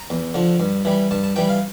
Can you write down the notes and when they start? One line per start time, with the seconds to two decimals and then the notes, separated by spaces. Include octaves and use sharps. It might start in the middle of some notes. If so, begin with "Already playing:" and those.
Already playing: A#5
0.10 E2
0.34 D3 F3
0.60 G2
0.85 E3 G3
1.11 G2 A5
1.24 A5
1.36 E3 G3 G5
1.49 F5